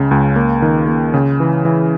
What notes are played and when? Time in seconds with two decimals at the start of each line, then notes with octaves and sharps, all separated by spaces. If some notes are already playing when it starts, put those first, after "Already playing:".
Already playing: C#2 C#3
0.11 C#2
0.36 A#3
0.62 D#3
0.88 A#3
1.14 C#3
1.40 E3
1.65 E3